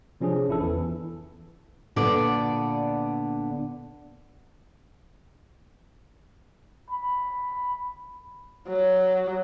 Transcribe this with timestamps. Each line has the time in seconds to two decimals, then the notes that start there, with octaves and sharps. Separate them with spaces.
0.21 C3 F3 C#4 D4 G#4
0.48 G#1 E4 A4
0.60 E2 E3
1.96 A#2 D3 B3 D4 D5
6.90 B5
8.68 F#3